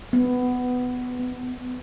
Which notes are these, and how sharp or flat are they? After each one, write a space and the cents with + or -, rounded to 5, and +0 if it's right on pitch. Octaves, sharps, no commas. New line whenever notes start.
B3 +15
B3 +45